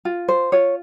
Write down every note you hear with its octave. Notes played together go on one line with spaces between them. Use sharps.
F4
C5
F4 C#5